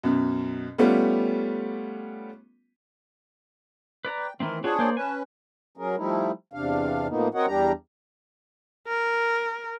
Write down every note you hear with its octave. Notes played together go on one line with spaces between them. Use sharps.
F#2 B2
G3 A3 B3 C#4 F4
B4 D5 A#5
G5
D#3 E3 A3 C4 A#4
C4 D4 F4 F#4 G#4 C#5
A#3 C5 D5
C#4 B4 G#5 A5
F#3 C#4 G#4 A#4
F3 G3 A3 D#4 E4
E2 C3 D4 F5
A2 F3 A#3 B3 D#4
C4 F#4 A#4 C#5 D#5 F#5
E2 G3 D4 G4 A#5
A#4